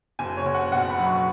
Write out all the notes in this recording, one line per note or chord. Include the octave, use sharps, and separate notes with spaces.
F#1 G#5
C#5
F#1
F#5
B2 F#5
B5
F#3
C#6